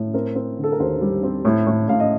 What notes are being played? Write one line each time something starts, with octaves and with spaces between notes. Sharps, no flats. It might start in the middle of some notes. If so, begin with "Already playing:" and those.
Already playing: A2
C4 A#4
C4
D3
A4
A#4
D#2 C5
G3
C4
A2
A2
A2 F5
D#5